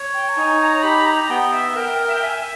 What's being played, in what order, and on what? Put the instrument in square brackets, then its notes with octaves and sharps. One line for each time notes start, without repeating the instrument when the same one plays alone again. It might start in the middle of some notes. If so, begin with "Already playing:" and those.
Already playing: [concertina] C#5
[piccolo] G5
A#5
[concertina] D#4 [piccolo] G#5
[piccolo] A#5
[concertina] G4 [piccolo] B5
[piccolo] A#5
[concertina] B3 [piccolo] G5
[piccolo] E5
[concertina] A#4 [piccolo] G5
[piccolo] G5
E5
G5
[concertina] E5 [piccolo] G#5